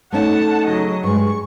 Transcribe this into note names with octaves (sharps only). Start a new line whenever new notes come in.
A3 C#4 D#4 F#5 A5
C#3 F#3 D#5
G2 G#3 C#6